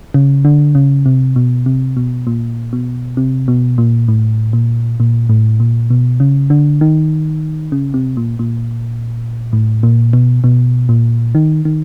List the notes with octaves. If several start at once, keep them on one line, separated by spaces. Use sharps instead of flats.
C#3
D3
C#3
C3
B2
C3
B2
A#2
B2
C3
B2
A#2
A2
A#2
A#2
A2
A#2
B2
C#3
D3
D#3
C#3
C3
A#2
A#2
A2
A#2
B2
B2
A#2
D#3
D#3